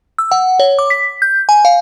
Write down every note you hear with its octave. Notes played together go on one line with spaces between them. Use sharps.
E6
F#5
C#5
D6
B6
G6
G#5
F5